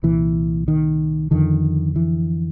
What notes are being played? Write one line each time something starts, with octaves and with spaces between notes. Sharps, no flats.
C2 A#2 E3
D#3
F2 D3 D#3
E3